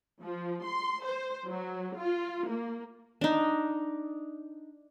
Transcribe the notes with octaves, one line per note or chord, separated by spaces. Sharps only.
F3
C6
C5
F#3
F4
A#3
D4 D#4